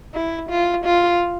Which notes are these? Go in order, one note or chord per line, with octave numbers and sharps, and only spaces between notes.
E4
F4
F4